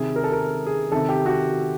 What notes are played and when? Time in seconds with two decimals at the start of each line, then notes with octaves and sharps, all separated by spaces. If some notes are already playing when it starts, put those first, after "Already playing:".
Already playing: C3 D#3 G#4
0.16 A#4
0.24 A4
0.32 A#4
0.66 G#4
0.92 C3 D#3 A4
1.09 G4
1.26 F#4